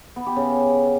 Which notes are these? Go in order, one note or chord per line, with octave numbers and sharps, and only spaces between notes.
B3
G4
C#3